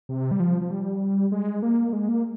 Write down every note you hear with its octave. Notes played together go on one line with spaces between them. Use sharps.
C3
G3
F3
F3
G3
G#3
A#3
G#3
A#3